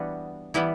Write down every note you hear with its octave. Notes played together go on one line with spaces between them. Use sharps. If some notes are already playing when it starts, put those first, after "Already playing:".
Already playing: E3 G3 B3 D4 F#4
E3 G3 B3 E4